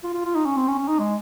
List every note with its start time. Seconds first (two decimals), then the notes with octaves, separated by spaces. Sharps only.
0.04 F4
0.14 F4
0.25 F4
0.35 D#4
0.46 C#4
0.56 C4
0.68 C#4
0.78 C#4
0.88 D#4
0.99 G#3